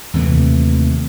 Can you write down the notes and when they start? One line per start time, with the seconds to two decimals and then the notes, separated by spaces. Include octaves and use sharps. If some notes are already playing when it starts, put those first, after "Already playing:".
0.13 D#2 C3 E3 A3